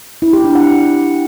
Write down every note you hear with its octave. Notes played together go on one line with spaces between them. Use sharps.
E4
G4
D4
F#5